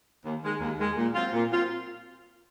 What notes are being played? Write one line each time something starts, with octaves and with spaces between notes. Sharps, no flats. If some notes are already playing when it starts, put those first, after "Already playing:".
D#2
D#3 G#3
D#2
D#3 G#3
A#2
F#3 C4 F4
A#2
F#3 C4 F4